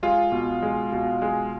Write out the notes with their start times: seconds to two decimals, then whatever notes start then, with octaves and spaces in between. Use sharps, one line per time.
0.03 G#3 F4
0.32 B2
0.62 G#3
0.92 B2
1.22 G#3